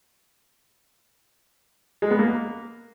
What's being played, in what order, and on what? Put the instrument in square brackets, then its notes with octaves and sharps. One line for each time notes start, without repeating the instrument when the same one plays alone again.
[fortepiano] G#3
B3
A#3